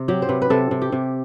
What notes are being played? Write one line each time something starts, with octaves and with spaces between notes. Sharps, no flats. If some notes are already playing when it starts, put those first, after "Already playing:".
Already playing: C3
F#3 G4
C5
C3 B4
B4
C3 A4
C3
G4
C3